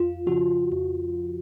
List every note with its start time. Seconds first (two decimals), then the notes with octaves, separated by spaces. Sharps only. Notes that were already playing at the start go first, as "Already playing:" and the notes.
Already playing: F2 F4
0.27 C#3 F3 F#4
0.72 F2